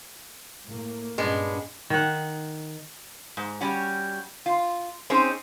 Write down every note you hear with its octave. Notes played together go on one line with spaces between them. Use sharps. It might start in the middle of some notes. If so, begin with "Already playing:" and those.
A2 A#3
G2 A#2 G#3 B3 C#4 D4
D#3 F#5
G#2
G3 C#4 F#4
F4
C4 C#4 D#4 G#4